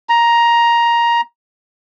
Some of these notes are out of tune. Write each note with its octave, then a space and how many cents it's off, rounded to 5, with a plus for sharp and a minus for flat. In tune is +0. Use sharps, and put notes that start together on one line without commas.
A#5 +10